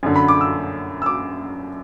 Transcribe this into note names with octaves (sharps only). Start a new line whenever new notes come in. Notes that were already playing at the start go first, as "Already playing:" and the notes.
F#2 D3
B5
D6
E6
E6
D6